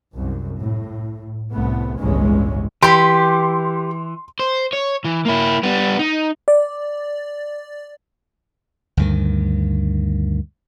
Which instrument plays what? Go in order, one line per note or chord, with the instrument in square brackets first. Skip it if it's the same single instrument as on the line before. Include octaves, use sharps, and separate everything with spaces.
[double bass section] C2 F#2
A2
C2 A2 A3 B3
G1 C#2 A2 E3 G#3 C#4
[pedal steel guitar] E3 [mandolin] G4 B5 [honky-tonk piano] C6
[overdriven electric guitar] C5
C#5
E3
A#3 E4
G3 B3
D#4
[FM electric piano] D5
[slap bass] D2 G2 D#3